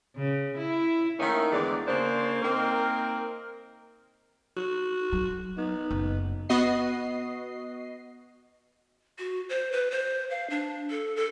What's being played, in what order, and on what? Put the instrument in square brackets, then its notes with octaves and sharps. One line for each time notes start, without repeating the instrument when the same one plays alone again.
[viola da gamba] C#3
E4
[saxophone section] D#3 A3 A#3 C#4 D#4 E5
E2 D3 E3 G#3 D5
C#3 A#3 D4 C5
A#3 C4 D#4 A#4
[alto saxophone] F#4
[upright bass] F#3
[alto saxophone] B3 [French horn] D#4
[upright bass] F#1
[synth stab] B3 F#4 D#5 C7
[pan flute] F#4
C5
B4
C5
F5
D4
A4
A4